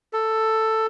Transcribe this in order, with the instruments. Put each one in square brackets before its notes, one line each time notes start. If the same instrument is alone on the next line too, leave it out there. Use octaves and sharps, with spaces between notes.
[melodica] A4